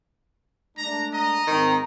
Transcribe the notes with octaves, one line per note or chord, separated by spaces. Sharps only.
G#3 A3 D4 A#5
D#5 A#5
G#2 D#3 C4